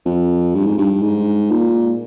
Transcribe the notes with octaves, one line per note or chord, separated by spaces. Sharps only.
F2
G2
G#2
G2
G#2
A#2